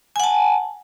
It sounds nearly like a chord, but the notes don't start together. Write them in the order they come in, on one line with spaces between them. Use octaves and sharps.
G#5 F#5 A5